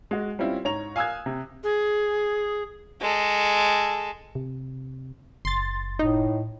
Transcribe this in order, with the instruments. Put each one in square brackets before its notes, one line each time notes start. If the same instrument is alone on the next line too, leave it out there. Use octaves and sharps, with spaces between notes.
[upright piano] G#3 F#4
G3 C4 C#4 E4 F4
G#2 C#5 A#5 F7
F5 G#5 D#6 E6 F#6 G#6
C3
[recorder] G#4
[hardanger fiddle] G#3 A4
[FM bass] C3
[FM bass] F#1 [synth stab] C6 A6
[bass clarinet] A2 [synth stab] D#4